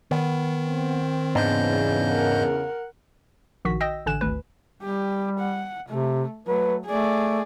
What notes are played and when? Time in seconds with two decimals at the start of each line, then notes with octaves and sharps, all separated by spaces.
0.11 D#3 B3
0.68 C4
1.35 E2 G#2 C#3 B3 D4 D#5 G6
2.08 A#4 F#5
3.65 A#1 D#3 F#4 B6
3.81 D#5 G5 E6 A#6
4.06 A1 D3 G#5 F#6 E7
4.21 G#1 D2 B4
4.82 G3 G4
5.39 F#5
5.88 C3 A3
6.47 F#3 A3 B4
6.86 A3 G#4 D5